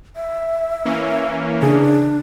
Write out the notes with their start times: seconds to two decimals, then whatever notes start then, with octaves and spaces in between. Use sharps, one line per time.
0.16 E5
0.85 E3 A#3 C#4
1.62 C#3 D4 G#4